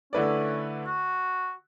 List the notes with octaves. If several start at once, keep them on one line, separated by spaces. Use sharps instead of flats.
D3 A3 C#4 E4 B4 D5
C#4
F#4